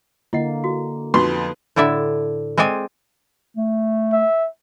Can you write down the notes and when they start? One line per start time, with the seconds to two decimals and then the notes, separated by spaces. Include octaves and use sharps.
0.33 D3 A#3 E4 D#5 F#5
0.64 F#4
1.14 F2 F3 C#4 D#4 F#4 B4 C6
1.76 A2 D3 E4 D5 E5
2.57 G#3 C4 C5 D5 G#5
3.57 A3
4.13 E5